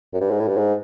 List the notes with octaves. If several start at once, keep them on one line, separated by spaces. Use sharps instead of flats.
F#2
G2
G#2
A2
G2
G#2